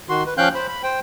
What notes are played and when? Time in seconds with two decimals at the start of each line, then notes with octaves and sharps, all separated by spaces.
0.09 D#3 F#4 C6
0.26 B4
0.38 F3 C#4 F5 G5 F#6 G6
0.55 C5 B5
0.68 B5
0.83 C5 G5